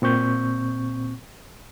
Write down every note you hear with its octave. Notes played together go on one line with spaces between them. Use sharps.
A#2 C4 C#6 G6